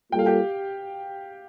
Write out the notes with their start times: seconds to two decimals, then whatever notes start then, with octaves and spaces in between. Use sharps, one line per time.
0.12 G3 A#3 F4 A4 G5
0.19 F5
0.26 G4 G5